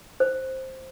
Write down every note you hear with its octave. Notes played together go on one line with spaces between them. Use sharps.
C5